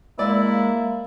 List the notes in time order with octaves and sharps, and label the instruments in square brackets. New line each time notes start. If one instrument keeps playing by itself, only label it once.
[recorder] G#3 [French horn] A#3 [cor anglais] E4 [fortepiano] D5